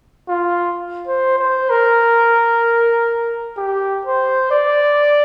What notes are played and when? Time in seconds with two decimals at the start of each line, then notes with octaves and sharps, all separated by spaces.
0.29 F4
1.07 C5
1.38 C5
1.70 A#4
3.57 G4
4.05 C5
4.51 D5